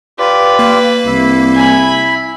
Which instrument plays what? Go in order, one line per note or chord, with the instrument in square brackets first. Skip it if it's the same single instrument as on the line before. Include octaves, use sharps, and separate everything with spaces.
[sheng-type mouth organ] F4 G4 D5 [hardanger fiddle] B4
[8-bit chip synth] A#3
[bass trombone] C2 [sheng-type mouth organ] E4 E5
[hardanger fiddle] G#5 B5